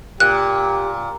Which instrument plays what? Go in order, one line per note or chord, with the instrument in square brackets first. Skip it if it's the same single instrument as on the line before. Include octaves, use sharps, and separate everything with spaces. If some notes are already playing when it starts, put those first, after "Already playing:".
[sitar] A#2 [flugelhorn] G4 [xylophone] F#6